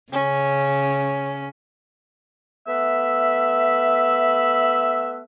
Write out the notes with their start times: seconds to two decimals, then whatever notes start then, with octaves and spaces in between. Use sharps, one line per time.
0.12 C#3 C#4
2.68 A3 B3 B4 E5